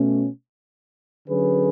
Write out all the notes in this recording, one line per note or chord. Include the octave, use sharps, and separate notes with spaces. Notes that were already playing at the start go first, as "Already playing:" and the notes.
Already playing: B2 A3 C#4
D3 F#3 C#4 G#4 B4